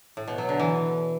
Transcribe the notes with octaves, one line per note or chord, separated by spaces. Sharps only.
A2
B2
F#3
D3
E3